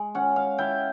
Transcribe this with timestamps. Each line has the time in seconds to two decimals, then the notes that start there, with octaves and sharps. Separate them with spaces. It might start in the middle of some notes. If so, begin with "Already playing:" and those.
Already playing: G#3
0.15 C#4 F#5
0.36 F5
0.58 E4 G5